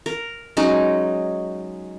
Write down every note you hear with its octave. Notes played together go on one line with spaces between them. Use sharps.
A#4
F#3 G#3 C#4 D#4